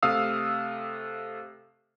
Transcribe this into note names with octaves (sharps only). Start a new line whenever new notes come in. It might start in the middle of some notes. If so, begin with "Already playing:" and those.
C3 A3 F5 D#6 E6